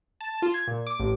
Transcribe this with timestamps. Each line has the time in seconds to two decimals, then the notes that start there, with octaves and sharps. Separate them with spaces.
0.21 A5
0.42 F4
0.54 G#6
0.67 A#2
0.87 D6
0.99 A1